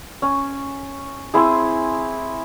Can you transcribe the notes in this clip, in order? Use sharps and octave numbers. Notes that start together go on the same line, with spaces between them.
C#4
C4 E4 G#4